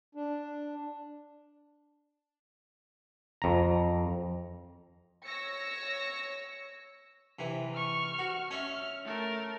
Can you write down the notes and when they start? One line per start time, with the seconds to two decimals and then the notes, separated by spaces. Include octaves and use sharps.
0.15 D4
3.42 F2 A#5
5.23 C#5 E6 A#6 C#7
7.39 C3 E3
7.74 C#6 F6
8.19 F#4
8.51 C#4 E5 C#6 F6
9.05 A3 A#4